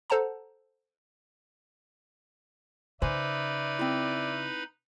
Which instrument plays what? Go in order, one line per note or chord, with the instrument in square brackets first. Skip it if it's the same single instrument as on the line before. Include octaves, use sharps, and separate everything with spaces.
[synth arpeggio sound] A4 C5 F#5 A5 A#5
[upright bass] C#3 [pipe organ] D#4 B4 B5 [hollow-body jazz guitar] C5 G#5 [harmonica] D5 E5
[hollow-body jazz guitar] C4 E4